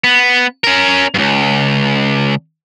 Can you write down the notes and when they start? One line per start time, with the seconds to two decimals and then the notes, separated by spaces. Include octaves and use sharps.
0.04 B3
0.64 C#4 A#4
1.14 C#2 G2